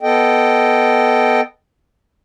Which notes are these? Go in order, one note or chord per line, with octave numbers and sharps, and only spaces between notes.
B3 A4 D#5 G5